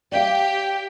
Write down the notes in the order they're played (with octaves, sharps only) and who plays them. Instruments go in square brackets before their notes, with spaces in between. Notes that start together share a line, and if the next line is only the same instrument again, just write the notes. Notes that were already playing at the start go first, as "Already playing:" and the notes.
[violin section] G4 [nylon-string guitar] D5 E5 F5